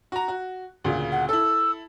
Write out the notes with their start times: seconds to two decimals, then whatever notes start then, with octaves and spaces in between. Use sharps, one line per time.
0.12 F#4 A#5
0.28 F#4
0.84 D2 A#2 C#3
1.12 F#5
1.29 E4 A4 E6